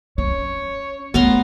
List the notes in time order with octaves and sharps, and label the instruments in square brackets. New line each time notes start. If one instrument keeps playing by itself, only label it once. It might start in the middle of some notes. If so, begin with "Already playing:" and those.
[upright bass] C#4 [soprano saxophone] C#5
[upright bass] A3 [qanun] B3 A#5 C6